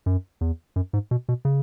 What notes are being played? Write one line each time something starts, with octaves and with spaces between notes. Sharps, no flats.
F#2
E2
F#2
G#2
B2
B2
C#3